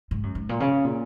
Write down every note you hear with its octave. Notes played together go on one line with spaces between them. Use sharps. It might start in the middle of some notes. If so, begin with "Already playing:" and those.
G#2
F#2
G#2
A#2
C#3
A#2